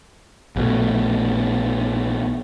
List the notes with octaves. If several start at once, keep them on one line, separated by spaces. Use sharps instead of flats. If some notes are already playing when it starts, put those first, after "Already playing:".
A#1 B2 A3